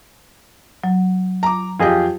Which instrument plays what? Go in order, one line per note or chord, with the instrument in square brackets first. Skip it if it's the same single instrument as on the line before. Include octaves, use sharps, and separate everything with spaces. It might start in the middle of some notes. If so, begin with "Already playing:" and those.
[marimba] F#3
[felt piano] A#5 D6
[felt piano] F2 G4 [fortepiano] F4 G#4 D#5